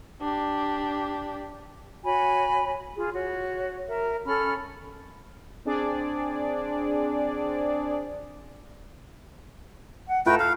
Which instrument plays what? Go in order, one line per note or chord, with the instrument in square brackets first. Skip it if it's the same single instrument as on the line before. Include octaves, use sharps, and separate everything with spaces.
[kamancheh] D4 G4
[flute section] F#4 C#5 G#5 B5
F4 G#4
F#4 C#5
A#4 E5
C#4 A4 B5 F6
[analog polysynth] C4 D4 G#4 D5
[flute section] F#5
[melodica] A3 B4 G5 [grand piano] F4 [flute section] A4 A#5
[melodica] F5 [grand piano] F#6